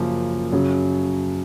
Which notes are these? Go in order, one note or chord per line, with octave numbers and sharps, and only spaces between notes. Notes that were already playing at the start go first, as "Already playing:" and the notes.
Already playing: F#2 C#3 F3 A#3
F#2 C#3 F#3